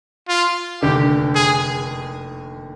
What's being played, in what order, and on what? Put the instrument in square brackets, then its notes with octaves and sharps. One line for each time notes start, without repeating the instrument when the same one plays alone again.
[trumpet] F4
[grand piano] F1 D#2 D3 [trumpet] G4
[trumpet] G#4